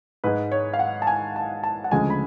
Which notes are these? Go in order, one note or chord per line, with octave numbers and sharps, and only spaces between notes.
G#2 G#3 B4
C#5
F5
F#5
A5
G#5
A5
A5
F#5
D2 C#3 F3 G#3 G#5
B5